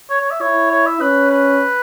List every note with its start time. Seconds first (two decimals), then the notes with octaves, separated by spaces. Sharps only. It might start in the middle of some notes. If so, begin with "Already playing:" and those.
0.10 C#5
0.21 C#5
0.31 E5
0.41 E4 C#5
0.71 C#5
0.86 E5
1.01 C#4 B4
1.30 B4